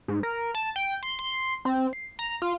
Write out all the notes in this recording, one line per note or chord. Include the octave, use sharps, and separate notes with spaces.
G#2
A#4
A5
G5
C6
C6
C4
C7
A#5
F4